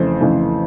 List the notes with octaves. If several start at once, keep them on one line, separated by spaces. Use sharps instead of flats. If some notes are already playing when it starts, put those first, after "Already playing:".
Already playing: F2 C#3 E3 A3 C5
F2 C#3 E3 A3